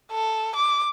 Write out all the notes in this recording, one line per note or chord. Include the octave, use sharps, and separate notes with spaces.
A4
D6